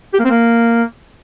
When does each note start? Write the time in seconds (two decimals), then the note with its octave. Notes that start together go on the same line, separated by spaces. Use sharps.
0.13 G4
0.19 A#3
0.25 C4
0.30 A#3